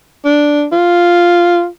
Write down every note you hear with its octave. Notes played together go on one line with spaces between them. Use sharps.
D4
F4